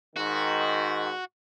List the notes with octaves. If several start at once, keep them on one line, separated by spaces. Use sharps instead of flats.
G#2 D#3 F#4